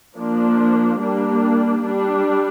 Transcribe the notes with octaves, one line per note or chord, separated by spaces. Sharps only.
F3 A#3 D4
G3 A#3 D4
G3 D4